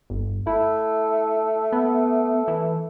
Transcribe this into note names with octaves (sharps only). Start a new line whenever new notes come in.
G1
A3 E4
B3
E3